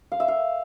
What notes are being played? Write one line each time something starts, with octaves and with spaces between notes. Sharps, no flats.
F5
E5
F5